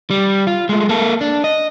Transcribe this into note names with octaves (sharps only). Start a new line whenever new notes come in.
G3
F4
G#3 A3
A#3 A4
D4
D#5